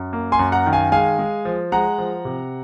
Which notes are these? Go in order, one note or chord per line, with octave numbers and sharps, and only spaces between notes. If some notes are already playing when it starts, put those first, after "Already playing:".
Already playing: F#2
A#3
G#5 C6
F#2
F#5 A#5
D#3
F5 G#5
G#3 F5 G#5
G#3
F3
G#3 F#5 A#5
F3
C3